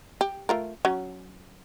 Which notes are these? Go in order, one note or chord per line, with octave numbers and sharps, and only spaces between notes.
G4
A3 F4 A#4
F#3 C#4